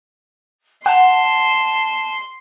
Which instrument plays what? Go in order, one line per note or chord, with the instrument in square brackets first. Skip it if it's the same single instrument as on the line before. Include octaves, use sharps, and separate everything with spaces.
[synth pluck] F#5 [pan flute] A5 [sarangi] C6